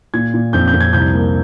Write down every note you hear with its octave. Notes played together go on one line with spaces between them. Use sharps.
A#2 G#6
A#2
F2 G6
G6
F2
G#6
C2 G6
A#3